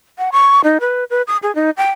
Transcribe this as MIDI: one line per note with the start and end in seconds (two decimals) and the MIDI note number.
0.18 0.30 78
0.32 0.61 85
0.64 0.78 63
0.80 1.04 71
1.10 1.22 71
1.27 1.37 87
1.43 1.54 68
1.55 1.70 63
1.77 1.91 79